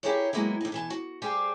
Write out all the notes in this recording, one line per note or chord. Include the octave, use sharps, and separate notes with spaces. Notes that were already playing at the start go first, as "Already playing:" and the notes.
E4 G4 G#4 A#4 C#5 D5
F#3 G#3 A#3 B3 E4
D#2 D#4
B2 E3 A5
F#4
G3 G4 G#4 C5 G5 A5